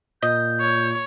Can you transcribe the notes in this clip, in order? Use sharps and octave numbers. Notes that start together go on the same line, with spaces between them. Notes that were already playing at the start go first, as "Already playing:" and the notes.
A#2 D#5 G6
C#5